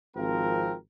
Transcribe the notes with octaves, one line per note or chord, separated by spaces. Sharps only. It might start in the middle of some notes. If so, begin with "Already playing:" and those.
G#1 F3 C4 A#4